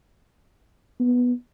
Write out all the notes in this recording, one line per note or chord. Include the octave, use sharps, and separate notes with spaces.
B3